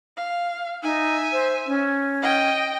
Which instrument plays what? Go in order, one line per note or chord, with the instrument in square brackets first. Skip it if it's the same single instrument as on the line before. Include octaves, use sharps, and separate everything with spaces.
[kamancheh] F5
[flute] D#4 [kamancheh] E5 G#5
[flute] C5
C#4
[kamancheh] D#5 G5